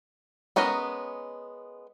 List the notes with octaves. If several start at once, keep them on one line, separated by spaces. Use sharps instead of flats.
G#3 B3 C#4 A#4 D#5